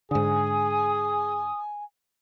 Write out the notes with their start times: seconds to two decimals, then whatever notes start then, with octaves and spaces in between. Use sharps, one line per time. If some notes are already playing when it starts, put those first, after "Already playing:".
0.11 G#2 D3 G#4 G#5 D#6